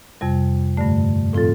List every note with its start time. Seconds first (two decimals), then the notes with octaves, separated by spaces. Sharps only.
0.21 F2 C3 G3
0.77 G2 D3 A3
1.33 A2 F3 C4 F4 A4